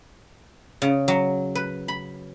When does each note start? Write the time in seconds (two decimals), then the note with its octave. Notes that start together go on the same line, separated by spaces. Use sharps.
0.82 C#3
1.08 F#3
1.55 B4
1.88 B5